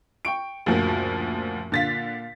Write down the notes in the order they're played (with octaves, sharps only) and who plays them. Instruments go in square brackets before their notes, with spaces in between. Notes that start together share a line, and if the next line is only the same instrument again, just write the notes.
[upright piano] G5 C#6 D7
[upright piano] F#1 A#2 F#4 [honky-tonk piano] D2 F3 A#3
[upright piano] A#2 F5 [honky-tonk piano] D3 A6 B6